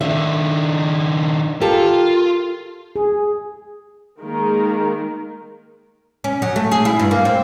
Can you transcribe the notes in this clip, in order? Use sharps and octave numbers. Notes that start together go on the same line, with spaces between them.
D#3 D4 E5
F4 G4 A4 A#4
G#4
D#3 G#3 A#3 A#4
C#4
F#3
A3
G#4
E4
G2
A#3
C4